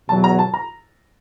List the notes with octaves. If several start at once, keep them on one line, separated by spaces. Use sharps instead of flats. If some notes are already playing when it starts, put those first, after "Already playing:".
E2 B2 F#3 A5
A#5
A5
A#5